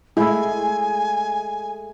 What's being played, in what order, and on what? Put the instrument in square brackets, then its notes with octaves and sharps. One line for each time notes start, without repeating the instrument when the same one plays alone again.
[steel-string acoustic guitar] G#3 A3 [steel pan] E4 [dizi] G#5